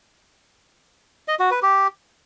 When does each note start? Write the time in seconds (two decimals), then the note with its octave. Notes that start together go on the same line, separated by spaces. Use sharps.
1.28 D#5
1.39 F#4
1.51 B4
1.62 G4